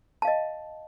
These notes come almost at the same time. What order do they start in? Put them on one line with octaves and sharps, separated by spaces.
A5 F5 D#5